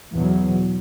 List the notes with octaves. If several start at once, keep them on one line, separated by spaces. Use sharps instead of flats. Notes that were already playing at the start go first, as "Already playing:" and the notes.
E2 B2 F#3